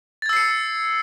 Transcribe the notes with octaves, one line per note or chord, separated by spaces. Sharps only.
E6 G#6 A6 C7 C#7